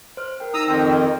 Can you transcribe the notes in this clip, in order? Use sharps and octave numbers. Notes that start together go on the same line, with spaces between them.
C5 F6
A#4 G5
D#4 A#5 D#6 E6
F2 D#3 G5 C6 G6